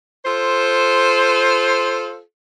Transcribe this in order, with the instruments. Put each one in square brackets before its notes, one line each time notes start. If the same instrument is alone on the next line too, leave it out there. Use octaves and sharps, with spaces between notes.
[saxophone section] F4 A4 C5